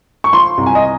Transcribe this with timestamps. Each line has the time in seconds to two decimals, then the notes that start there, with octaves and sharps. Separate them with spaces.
0.24 C#6
0.33 F3 C6
0.58 C2
0.66 G#5
0.75 D#5